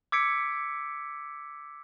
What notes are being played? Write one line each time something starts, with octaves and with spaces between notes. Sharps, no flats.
D6 E6 G#6 B6 C#7 D7